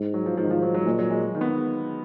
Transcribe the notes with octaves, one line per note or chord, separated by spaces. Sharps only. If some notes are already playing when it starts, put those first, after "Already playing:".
Already playing: G#2
F#3
F3
G#2 F3
D#3
F3
F#3
F#3
A#2 G#3
F#3
G#3
F#3
D#3
B3